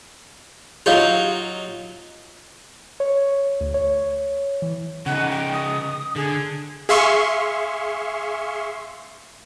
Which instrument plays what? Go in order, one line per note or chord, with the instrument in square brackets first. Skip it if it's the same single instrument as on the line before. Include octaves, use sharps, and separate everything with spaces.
[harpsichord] F#3 D#4 F4 [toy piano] G4 C#5 F5
[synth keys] C#5
D2
C#5
E3
[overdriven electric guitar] C#3 D#4 [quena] F#5
[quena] G5
D#6
[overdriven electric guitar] D3 [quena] G#4
[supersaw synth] G#4 E5 F5 C6 C#6